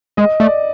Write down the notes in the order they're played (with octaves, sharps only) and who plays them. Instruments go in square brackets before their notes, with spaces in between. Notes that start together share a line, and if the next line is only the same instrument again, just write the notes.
[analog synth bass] G#3 [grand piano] D#5
[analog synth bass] A3 [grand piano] D5